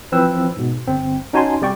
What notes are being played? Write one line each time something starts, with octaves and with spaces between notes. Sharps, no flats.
E3 F3 C4 B4 E6
G#2 B2
G1 C4
C#4 D#4 F#4 G#5 A5 C6
C3 G3 D5 G5 C#6